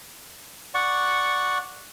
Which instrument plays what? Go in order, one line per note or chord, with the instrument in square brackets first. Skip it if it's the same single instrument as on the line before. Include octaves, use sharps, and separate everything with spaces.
[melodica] D5 F#5 C#6